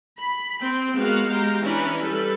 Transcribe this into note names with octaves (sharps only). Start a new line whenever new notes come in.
B5
C4 G5
G#3 B3 F#4 A#4 F5 F#5
G#3 G4 F5 G5 A#5
E3 C#4 D4 E4 B4 A#5
G3 A4 B4